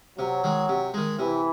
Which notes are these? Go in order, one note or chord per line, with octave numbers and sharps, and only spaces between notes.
C3 F#3
D#3 G#3
C3
D#3 G#3
C3 E3